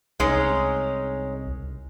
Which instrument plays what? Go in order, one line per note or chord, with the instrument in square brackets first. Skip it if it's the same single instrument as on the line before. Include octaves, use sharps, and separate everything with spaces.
[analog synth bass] C2 [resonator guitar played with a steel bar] G#3 C#4 D#4